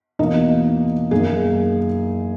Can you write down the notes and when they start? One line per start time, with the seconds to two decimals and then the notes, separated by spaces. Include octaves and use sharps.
0.19 E2 B2 A#3 D#4 D#5
1.11 F#2 D#3 A#3 G#4